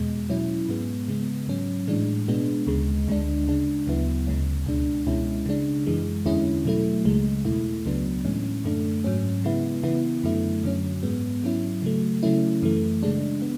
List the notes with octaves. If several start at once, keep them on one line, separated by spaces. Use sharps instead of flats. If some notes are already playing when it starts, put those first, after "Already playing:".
Already playing: E2 B2 G#3
B2 F#3 C#4 E4
G#2 G#3 B3
C#3 G#3 B3
G#2 F#3 C#4
A2 E3 G#3 D4
B2 G#3 B3 D4
D2 C#3 G#3
D2 D3 G#3 D4
C#3 G#3 D4
D2 C#3 F#3 B3 E4
D2 C#3 G#3 C#4
C#2 B2 G#3 D4
C#2 B2 G#3 C#4 E4
C#3 G#3 D4
F#2 E3 G#3
E2 D3 G#3 C#4 E4
B2 F#3 A3 E4
C#2 C#3 G#3
E2 B2 A3 E4
C#2 C#3 F#3 B3 D4
A2 E3 G#3 C#4
F#2 D3 A3 D4
G#2 F#3 C#4
C#3 G#3 B3 E4
C#3 E3 B3 E4
F#2 D3 F#3 A3 E4
F#2 D3 F#3 C#4
G#2 G#3 B3
G#2 F#3 C#4 E4
C#3 F#3 A3
C#3 F#3 A3 C#4 E4
F#2 E3 A3
C#3 G#3 D4
B3